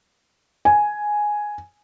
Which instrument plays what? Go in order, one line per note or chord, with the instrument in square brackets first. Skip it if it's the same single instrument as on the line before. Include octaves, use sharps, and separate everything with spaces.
[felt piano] G#5